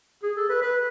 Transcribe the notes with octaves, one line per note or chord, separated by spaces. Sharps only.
G#4
A4
B4
B4